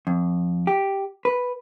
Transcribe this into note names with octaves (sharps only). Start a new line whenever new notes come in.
F2
G4
B4